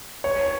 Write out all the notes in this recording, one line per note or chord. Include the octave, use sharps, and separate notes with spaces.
C#5